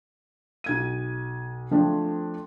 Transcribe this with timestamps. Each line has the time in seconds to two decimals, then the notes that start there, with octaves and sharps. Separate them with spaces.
0.64 B1 G#6 D#7
1.71 F3 A3 C4 D4